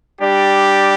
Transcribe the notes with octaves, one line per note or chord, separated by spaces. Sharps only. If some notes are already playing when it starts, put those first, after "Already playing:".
G3 D4 G4 D5